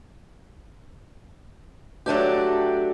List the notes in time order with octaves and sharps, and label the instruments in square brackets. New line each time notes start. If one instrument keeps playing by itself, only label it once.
[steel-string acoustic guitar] F#3 A3 D4 G4